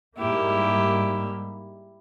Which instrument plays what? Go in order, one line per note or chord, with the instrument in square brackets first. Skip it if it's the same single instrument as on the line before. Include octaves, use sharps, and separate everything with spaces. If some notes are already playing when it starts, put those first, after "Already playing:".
[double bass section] G#2 G3 A#3 [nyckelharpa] E4 G4